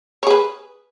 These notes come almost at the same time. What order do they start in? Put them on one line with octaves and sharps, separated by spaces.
C#5 G#4 B4